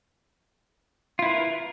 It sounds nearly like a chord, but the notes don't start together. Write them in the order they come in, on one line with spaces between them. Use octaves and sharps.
F4 E4 B4 A#4